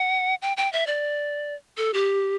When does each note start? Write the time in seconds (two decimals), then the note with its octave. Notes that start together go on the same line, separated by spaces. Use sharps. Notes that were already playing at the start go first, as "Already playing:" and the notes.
Already playing: F#5
0.42 G5
0.57 G5
0.73 E5
0.87 D5
1.77 A4
1.94 G4